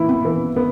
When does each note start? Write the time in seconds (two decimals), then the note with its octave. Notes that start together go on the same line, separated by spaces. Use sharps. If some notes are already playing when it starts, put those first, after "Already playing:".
Already playing: E3 A#3 E4
0.09 B3
0.25 E3
0.56 B3